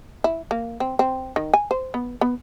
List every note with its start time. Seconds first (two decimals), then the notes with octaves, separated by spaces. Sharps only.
0.24 E4
0.51 A#3
0.80 C4
0.99 C4
1.36 D#3
1.54 G#5
1.71 C5
1.94 B3
2.21 B3